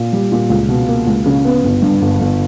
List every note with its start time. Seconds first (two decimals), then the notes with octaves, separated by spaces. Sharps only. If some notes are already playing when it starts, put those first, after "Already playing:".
Already playing: A#2
0.13 G3
0.32 A#2
0.49 C#2
0.68 B2
0.88 A#3
1.07 C#2
1.26 C#3
1.45 B3
1.64 G1
1.82 G2
2.02 G1
2.21 G1